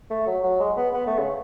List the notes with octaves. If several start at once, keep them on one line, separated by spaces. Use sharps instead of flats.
A3
F#3
F#3
G#3
B3
B3
A3
C#3